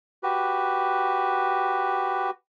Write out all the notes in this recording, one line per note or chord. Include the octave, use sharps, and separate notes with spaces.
F#4 G4 B4